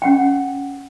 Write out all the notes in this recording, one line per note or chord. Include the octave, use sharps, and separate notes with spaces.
C#4 F#5 G5